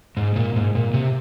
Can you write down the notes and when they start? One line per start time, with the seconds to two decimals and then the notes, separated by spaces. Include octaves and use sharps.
0.17 G#2
0.36 A#2
0.56 G#2
0.75 A#2
0.94 C3